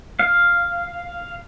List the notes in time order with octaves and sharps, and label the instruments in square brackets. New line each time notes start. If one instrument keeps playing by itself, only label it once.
[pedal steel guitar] F5